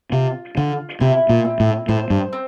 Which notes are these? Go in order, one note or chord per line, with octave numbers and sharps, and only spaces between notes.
C3 F4
D3 F4
C3 E4
A#2
C4
A2
A2 C5
G2
C4